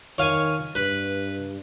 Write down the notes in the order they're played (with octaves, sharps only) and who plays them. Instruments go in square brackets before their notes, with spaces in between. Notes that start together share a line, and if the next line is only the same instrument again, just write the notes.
[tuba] D#3 [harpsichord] C#5 F5 G#5
[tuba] G2 [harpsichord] B4